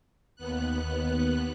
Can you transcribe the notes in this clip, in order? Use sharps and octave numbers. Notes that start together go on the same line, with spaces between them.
D#2 B3 F#6